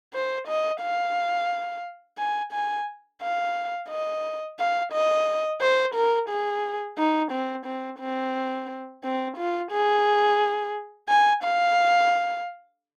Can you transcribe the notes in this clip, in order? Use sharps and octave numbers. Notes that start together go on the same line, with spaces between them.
C5
D#5
F5
G#5
G#5
F5
D#5
F5
D#5
C5
A#4
G#4
D#4
C4
C4
C4
C4
F4
G#4
G#5
F5